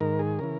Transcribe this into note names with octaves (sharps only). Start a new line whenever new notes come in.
G#2 D#3 A#4
G#4
C#3 E3 A#4